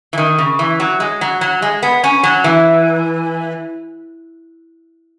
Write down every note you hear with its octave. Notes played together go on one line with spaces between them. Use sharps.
E3
D#3
C#3
E3
F#3
G#3
F#3
F#3
G#3
B3
C#4
F#3
E3